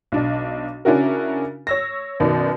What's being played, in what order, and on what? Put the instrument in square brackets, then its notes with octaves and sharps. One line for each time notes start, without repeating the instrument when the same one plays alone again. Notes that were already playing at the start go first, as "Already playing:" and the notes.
[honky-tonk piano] B1 D4 D#5
C#3 C#4 D4 E4 F#4 A#4
C#5 E6 A#6
F#2 B2 D#3 D5